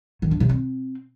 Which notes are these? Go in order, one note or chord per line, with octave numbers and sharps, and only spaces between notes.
D#3
D4
C3
C4